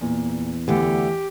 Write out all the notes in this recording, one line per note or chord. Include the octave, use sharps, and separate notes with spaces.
E2 A#2
D2 D3 E3 G4